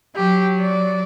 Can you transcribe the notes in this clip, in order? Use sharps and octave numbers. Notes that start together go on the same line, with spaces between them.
F#3 G4
D5